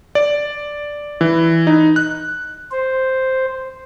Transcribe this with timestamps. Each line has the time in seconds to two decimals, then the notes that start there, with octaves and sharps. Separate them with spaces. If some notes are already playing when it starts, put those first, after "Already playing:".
0.15 D5
1.21 E3
1.67 D#4
1.96 F#6
2.71 C5